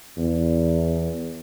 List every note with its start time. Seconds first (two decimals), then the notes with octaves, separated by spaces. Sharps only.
0.17 E2